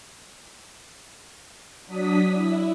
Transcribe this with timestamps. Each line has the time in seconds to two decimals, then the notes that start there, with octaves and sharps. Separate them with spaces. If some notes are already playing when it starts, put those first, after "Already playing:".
1.86 F#3 D4 D#6 B6
2.31 E4